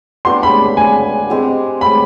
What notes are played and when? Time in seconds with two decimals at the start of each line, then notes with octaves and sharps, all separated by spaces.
0.25 B3 D4 G4 B4 C6
0.43 B5
0.77 G#5
1.30 G#3 C4 G4
1.81 B5